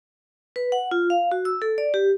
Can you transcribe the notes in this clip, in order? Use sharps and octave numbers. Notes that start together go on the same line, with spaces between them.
B4
F#5
F4
F5
F#4
E6
A4
D5
G4